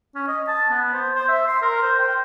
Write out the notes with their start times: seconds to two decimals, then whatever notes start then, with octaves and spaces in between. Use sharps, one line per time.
0.15 C#4
0.28 D#5
0.48 A5
0.70 B3
0.94 C5
1.16 C5
1.29 E5
1.47 C6
1.62 A#4
1.83 C5
1.99 G5